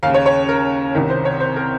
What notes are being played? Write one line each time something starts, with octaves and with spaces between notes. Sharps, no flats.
D#2 C#3 F5
C#5
C#5
A#4
C2 C3 D#3
C5
C#5
C5
A#4